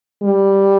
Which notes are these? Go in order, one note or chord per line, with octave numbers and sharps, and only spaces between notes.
G3